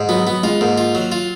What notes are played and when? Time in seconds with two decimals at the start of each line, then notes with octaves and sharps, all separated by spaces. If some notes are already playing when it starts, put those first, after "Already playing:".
Already playing: G#2
0.09 F#3 B3
0.27 F#3 B3
0.43 G#3 F4
0.61 G#2 A#3
0.78 F4
0.95 F#3
1.12 F4